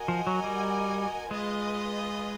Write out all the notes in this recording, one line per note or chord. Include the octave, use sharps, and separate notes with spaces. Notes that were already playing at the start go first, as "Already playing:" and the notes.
Already playing: F#4 A#4 D#5 G#5
F3
F#3
G3
G#3 F4 G#4 B4 D#5